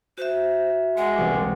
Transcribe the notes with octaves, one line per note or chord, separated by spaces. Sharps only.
F#4 C5 E5
G#3 F#5
E1 C2 D6